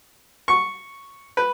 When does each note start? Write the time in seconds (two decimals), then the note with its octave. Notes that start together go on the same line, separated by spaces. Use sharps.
0.48 C#6
1.37 B4